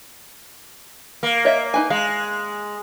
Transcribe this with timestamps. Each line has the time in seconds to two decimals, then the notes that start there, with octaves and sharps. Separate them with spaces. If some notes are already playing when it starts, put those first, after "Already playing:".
1.23 A#3
1.45 C#5 D#5 E5
1.74 D#4 B4 G#5
1.90 G#3 F5